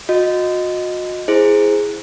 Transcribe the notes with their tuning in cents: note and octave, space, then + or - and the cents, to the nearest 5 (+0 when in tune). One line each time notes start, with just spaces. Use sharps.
F#4 -35 D#5 +0
E4 +0 G#4 +0 C5 +0